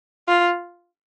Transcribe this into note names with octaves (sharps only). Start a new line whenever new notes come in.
F4